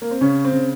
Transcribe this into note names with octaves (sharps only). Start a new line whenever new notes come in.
A#3
C4
C#3 C#4
C4
C#3